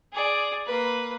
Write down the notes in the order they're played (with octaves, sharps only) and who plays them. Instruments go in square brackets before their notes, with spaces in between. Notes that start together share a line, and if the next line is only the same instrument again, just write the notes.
[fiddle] G#4 D5
A#3 B4